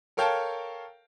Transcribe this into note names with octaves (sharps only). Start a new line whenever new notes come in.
A4 A#4 C#5 F5 G5 A5